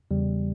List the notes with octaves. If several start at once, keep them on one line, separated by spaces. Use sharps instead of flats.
E2 C#3 G3